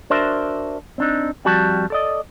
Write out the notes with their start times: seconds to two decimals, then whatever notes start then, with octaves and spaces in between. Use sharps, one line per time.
0.10 D4 F#4 A#4 C5 D5 E5
0.98 C4 D4 D#4
1.45 F2 G3 F#4 A5
1.90 A4 D5 D#5